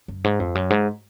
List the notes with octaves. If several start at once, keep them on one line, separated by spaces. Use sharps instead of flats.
F#2
G#2
F2
F#2
G#2